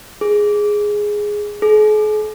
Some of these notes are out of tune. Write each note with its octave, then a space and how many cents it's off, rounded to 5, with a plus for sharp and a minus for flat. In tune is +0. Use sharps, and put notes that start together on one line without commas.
G#4 +0
G#4 +45